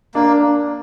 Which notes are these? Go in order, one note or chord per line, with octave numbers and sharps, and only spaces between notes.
A#3 D4